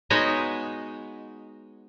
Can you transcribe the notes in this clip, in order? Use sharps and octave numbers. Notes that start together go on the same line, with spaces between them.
G#3 B3 D#4 F#4 C#5 D#5